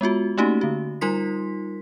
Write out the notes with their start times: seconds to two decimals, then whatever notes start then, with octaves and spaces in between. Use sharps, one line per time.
0.01 G#3 B3 F4 F#4
0.38 A3 A#3 C#4 D#4 F#4 G4
0.61 D3 F#4
1.01 G3 D#4 F4 A#4 C6 B6